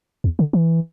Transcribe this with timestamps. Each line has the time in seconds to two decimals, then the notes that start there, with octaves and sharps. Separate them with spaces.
0.24 E2
0.39 D3
0.53 E3